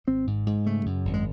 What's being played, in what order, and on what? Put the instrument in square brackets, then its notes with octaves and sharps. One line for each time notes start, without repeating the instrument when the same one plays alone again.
[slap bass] G#1 C4
G#2
G#2
C#3 A3
F#2
G#1
G#3